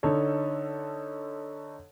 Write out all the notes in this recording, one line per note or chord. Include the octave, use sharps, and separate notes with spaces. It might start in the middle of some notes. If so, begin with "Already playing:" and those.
D3 D#4 A4 C#5